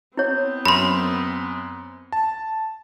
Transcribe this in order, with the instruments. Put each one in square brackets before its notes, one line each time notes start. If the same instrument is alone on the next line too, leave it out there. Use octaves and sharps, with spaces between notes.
[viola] B3 C4 [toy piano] E4 C#5
[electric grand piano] F#2 [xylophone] B5 C6
[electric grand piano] A5